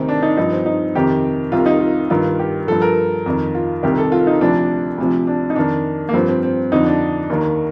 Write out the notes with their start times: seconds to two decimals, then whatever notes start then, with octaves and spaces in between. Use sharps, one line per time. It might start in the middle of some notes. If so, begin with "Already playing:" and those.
Already playing: D2 C3 D#3 C4
0.09 D4
0.22 D#4
0.37 G2 F3 D#4
0.52 C4
0.66 D#4
0.95 F2 C3 D#3 G4
1.52 C2 C3 D#3 F4
1.66 D#4
1.79 F4
2.10 G2 D#3 F4
2.39 G4
2.67 G2 F3 A4
2.82 A#4
3.26 F2 D#3
3.55 F4
3.83 C2 C3 D#3 G4
3.98 A4
4.12 F4
4.27 D#4
4.41 D2 C3 F3 D4
4.98 D2 C3 F3
5.27 D4
5.50 D#4
5.56 F2 D#3 D4
6.09 A#3
6.13 G2 F3 C4
6.28 C4
6.43 C4
6.72 F2 D3 F3 D#4
6.86 D4
7.30 D#2 D#3